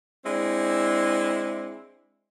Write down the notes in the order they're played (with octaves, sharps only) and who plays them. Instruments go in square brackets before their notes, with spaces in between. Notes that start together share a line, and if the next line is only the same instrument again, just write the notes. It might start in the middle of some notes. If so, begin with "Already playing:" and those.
[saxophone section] G#3 C4 D4 E4